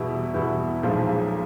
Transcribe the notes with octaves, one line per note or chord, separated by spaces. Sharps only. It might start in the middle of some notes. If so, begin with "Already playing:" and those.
Already playing: E2 B2 G3 B3 E4
E2 B2 G3 B3 E4
B1 A#2 F3 G#3